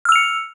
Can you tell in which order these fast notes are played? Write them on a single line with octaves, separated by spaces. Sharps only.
F6 E6 F7 C#7